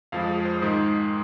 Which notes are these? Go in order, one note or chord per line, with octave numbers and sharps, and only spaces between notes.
F2 F3 G#3 F5
G#4
C5
G#2 D#3 G#3 G#4